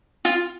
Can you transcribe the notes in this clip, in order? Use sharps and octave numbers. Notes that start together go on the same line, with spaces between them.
F4